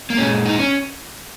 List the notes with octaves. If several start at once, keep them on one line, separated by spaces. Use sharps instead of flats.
A#3
A#2 G#3 C#4
D#4
C#4